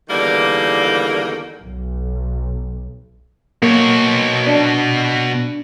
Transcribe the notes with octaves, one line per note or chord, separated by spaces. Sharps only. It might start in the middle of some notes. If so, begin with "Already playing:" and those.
E2 D3 D#3 G3 A#3
B1
B2 A#3 C#5
D4